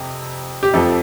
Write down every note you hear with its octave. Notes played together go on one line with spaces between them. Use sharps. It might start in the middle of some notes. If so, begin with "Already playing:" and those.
Already playing: F2 C3
G4
F2 F3 A4